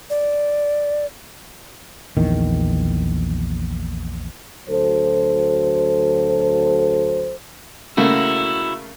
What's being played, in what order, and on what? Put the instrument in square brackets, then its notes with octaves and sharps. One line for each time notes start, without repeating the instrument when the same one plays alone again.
[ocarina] D5
[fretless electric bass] A#1 E2 D#3
[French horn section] D2 F#3 A4 C5
[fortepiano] C#3 A3 A#3 [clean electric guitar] E4 F#4 [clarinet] E6